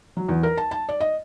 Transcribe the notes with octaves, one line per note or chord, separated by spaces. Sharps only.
F#3
E2
A#4
A5
A5
D5
D#5